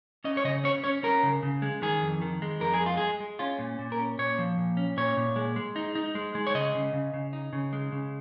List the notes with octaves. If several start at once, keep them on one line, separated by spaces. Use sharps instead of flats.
C#4 D#5
C#5
C#3 D#5
C#4 C#5
C#4 C#5
C#4 A#4
C#3
C#3
G#3
D#3 G#4
F2
D#3
G#3
F2 A#4
G#4
G#3
F4
G#3 G#4
G#3
C#4 F4
A#2
A#2
A#4
C#4
A#2 C#5
F3
A#2
C#4
A#2 C#5
A#2
G#3
G#3
D#4
D#4
G#3
G#3
C#5
C#3 D#5
C#3
C#3
C#3
D#4
C#3
G#3
C#3